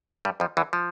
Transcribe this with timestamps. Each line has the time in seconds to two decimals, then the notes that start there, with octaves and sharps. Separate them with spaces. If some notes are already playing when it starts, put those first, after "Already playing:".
0.25 G2 G3
0.40 F2 F3
0.57 E2 E3
0.73 F3